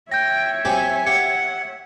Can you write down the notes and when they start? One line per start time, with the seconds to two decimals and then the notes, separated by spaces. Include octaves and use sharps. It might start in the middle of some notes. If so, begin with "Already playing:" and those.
0.11 C#5 E5 G5 G6 A#6
0.65 F#3 C4 G4 G#5
1.07 G4 F#5 C#7